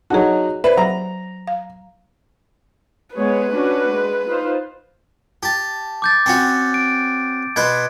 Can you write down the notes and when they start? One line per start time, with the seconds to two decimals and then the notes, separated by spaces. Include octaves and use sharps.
0.10 F#3 D#4 F#4 G#4 A5
0.64 B4 C5 D5 E5
0.77 F#3 A#5
1.48 F5
3.16 G#3 B3 B4 C#5
3.52 C#4 D4 F#4
3.88 G#3
4.27 D#4 F4 C5
5.43 G4 A5
6.02 D6 G6 A6
6.26 C4 C#4 F#4
6.74 D7
7.56 B2 B4 C5 G#6